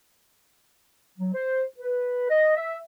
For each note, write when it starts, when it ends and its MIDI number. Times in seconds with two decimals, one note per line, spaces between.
1.18 1.31 54
1.34 1.64 72
1.78 2.27 71
2.30 2.54 75
2.56 2.77 76